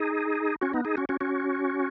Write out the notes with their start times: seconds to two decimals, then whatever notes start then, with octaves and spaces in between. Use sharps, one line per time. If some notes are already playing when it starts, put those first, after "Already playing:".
Already playing: D#4 G#4
0.61 C#4 F#4
0.73 B3 D#4
0.85 D#4 G#4
0.97 C#4 F#4
1.09 C#4 F#4
1.21 C#4 F#4